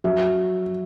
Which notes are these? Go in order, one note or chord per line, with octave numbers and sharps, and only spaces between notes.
F#3 E5